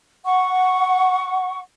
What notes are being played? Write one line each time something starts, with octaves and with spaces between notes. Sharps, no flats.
F#5 C#6